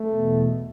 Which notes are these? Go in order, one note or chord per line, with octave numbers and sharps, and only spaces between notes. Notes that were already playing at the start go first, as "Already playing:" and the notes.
Already playing: A3
E2 B2